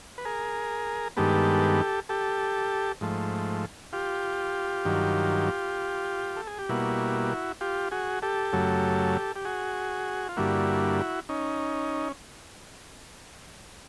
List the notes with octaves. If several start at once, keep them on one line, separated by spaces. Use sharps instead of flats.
B4
G#4 A#4
G2 D#3 G#3 B3 G4 A4
G4 A4
G#2 F3 A3
F4 G4
G2 D#3 F#3
A4
G#4
G4
B2 G3 A#3 E4 F#4
F4 G4
F#4 G#4
G4 A4
F#2 C#3 F#3 A3
G4
F#4 G#4
F4
G2 D3 G3 A#3 E4 F#4
C#4 D#4